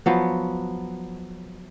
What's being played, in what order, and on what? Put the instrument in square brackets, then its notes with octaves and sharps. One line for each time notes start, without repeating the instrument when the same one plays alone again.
[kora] F3 F#3 B3